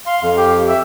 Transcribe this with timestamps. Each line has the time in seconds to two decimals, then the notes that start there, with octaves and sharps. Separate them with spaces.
0.07 F5 C6
0.22 F2 F5
0.38 G4
0.69 E5